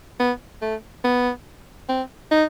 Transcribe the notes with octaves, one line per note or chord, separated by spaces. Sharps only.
B3
A3
B3
C4
D#4